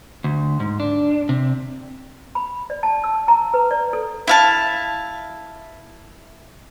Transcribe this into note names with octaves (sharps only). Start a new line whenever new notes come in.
D2
G#2
D4
C3
B5
D5
A5
E6
A#5
B4
D5
A4
E4 F5 A5